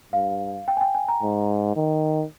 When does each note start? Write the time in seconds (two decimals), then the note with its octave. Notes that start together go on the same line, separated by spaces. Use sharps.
0.12 G2 F5
0.68 G5
0.77 G#5
0.81 G5
0.95 G#5
1.08 A#5
1.22 G#2
1.76 D#3